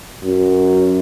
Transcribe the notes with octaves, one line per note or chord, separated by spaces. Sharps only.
F#2